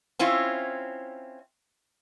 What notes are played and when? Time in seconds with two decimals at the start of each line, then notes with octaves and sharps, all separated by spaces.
0.19 C4 C#4 E4 F4